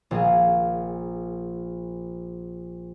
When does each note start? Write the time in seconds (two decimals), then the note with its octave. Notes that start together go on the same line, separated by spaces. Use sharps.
0.11 A#1 A#3 G#4